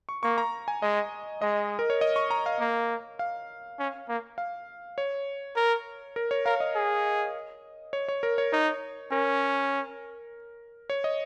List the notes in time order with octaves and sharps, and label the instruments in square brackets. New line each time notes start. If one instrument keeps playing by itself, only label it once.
[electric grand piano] C#6
[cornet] A#3 [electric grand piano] C#6
[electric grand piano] A#5
G#5
[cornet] G#3 [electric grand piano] D#5
[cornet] G#3 [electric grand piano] D#5
[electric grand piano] A#4
C#5
D#5
C#6
A#5
F5
[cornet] A#3
[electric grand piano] F5
[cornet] C#4
A#3
[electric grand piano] F5
C#5
[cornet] A#4
[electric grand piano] A#4
C#5
[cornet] A#4 [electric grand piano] F5
[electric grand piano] D#5
[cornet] G#4
[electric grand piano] C#5
C#5
A#4
C#5
[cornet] D#4 [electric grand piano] C#5
[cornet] C#4 [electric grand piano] A#4
[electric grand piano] C#5
D#5